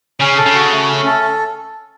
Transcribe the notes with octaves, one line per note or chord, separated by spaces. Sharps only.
C#3 C#4
A4
C#3
F#4
A3
C#4
A4